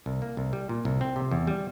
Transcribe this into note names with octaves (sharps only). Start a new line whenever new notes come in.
C2
A#3
C2
G3
A#2
C2
C4
C3
E2
G3